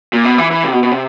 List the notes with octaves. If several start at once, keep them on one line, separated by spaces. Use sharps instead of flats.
A#2
B2
E3
E3
C3
B2
B2
C3